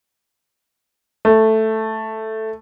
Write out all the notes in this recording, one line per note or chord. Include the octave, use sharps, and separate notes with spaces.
A3